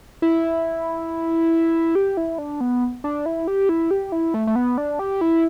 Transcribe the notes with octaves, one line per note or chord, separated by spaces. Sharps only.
E4
G4
E4
D4
B3
D4
E4
G4
E4
G4
E4
A3
A3
B3
D4
G4
E4